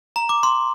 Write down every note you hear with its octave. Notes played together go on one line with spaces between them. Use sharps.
A#5
D6
C6